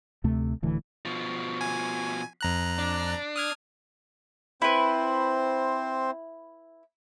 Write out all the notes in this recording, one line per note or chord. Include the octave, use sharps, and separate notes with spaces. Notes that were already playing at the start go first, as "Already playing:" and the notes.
D2 C3 A3
D1 D2 E3
B2 F3
G#5
F2 A#5 F#6
D4
D#6 F6 G#6
C4 E4 B4 C5